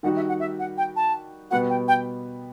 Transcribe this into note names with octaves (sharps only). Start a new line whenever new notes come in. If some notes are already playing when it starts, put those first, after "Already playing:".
D#3 G3 D#4 F#4 F#5
E5
F#5
E5
F#5
G5
A5
B2 G3 B3 F#4 F#5
G5
G5